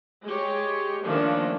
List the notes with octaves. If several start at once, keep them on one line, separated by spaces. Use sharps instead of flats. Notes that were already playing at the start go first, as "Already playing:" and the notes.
G#3 G4 C#5
D#3 F3 A3 A#3 C#4 D4